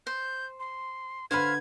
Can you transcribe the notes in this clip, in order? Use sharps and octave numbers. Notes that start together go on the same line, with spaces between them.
C5 G6
C6
D3 B4 C5 F5 B5 F6 G#6